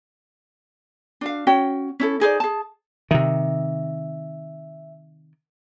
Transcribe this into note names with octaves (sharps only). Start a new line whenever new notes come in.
D4 F#4 F5
C#4 F#4 C#5 G5
C#4 E4 A4
D#4 G#4 C5 D5
G#4 A5
C3 D#3 E5